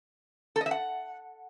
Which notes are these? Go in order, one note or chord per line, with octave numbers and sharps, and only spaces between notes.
A4
D#5
E5
F#5